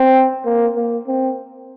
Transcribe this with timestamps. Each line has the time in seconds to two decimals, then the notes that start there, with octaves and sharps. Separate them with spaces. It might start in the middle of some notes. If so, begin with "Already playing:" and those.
Already playing: C4
0.45 A#3
0.76 A#3
1.07 C4